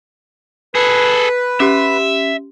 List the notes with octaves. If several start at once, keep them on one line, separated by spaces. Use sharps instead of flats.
G#4 A4 B4
C#4 G4 E5